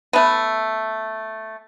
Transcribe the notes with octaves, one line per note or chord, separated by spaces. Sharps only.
A3 B3